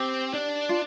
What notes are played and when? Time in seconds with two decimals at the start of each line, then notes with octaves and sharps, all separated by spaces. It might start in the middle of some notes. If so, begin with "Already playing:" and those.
Already playing: C4 G4
0.33 D4
0.69 F4